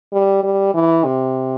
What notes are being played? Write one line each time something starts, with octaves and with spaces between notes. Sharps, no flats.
G3
G3
E3
C3